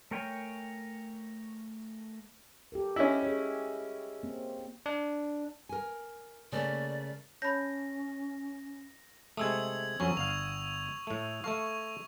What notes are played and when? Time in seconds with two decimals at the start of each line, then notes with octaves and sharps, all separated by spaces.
0.11 A3 A#4 C#5 G5 G#5
2.72 G4 A4 A#4
2.96 C#4 E4 D#5
3.23 G#4 C#5
4.23 A#3 C4
4.86 D4
5.69 A#4 G#5
6.52 C#3 A3 A#3 D5
7.42 C#4 C#5 A5 B5 G6 A#6
9.37 C3 G#3 A3 D#6 E6 G#6
10.00 F2 F#3 C#4 C#6
10.17 G1 F5 F7
11.07 A2 A3
11.44 A3 A4 F5 C#6